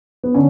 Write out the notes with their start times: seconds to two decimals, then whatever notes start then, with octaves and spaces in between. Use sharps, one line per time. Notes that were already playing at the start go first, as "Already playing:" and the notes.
0.24 B3
0.34 D3 C#4